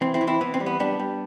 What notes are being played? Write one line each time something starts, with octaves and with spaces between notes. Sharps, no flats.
E3 C4
C4 E4
E3
C4 E4
E3 B3
C4
G3
B3
G3 B3 D4
G3